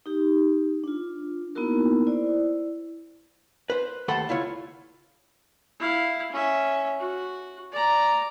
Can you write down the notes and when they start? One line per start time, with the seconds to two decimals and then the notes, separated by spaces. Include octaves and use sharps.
0.06 D#4 G4
0.84 D4 F4
1.55 A#3 B3 D#4 E4 F#4 A#4
2.07 E4 C5 D5
3.70 B4 C5
4.08 D#2 A3 A4 C5 F#5 B5
4.29 C#2 E4 F4 C#5
5.79 E4 F5
6.32 C#4 E5
7.00 F#4
7.72 D5 A#5